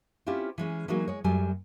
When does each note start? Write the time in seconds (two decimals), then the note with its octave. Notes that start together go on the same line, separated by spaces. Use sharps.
0.27 C4 C#4 E4 F4 G4
0.58 E3 G#3 C#4
0.88 E3 F#3 G#3 A#3 D#4 F#4
1.08 G#3 C#5
1.24 F#2 F#3 G3 A3 G#5